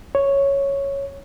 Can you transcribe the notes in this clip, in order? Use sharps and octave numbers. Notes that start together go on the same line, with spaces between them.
C#5